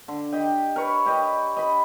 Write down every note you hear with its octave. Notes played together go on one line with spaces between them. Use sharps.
D3
G4 D#5 G5
A#4 B4 C#5 C#6
G4 B4 D#5
D#5 B5